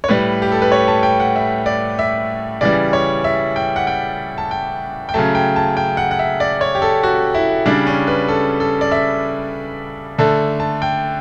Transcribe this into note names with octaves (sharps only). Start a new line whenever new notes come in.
C#5
A2 G3 B4
G4
A4
B4
C#5
A5
G5
F#5
E5
D5
E5
C#3 E3 G3 D5
C#5
E5
G5
F#5
G5
A5
G5
G5
C#3 F#3 A3 A5
G5
A5
G5
F#5
F#5
E5
D5
C#5
G4
A4
F#4
E4
C#3 G3 D4
C#4
B4
A4
A4
D5
E5
D3 A3 A5
A5
G5